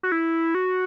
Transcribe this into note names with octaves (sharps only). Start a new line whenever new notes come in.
F#4
E4
F#4